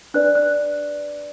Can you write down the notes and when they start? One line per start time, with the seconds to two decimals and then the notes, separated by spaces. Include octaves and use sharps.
0.14 D4 B4 D5 F#6
0.35 F#6